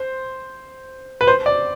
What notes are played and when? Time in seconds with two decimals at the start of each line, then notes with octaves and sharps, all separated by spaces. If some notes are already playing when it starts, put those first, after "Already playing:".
Already playing: C5
1.21 B4
1.27 C5
1.46 D5